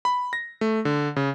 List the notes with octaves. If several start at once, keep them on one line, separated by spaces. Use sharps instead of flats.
B5
A#6
A3
D3
C#3